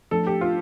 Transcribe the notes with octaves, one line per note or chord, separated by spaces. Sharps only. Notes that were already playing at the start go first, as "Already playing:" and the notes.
F3 A3 D4 A4
G4
F4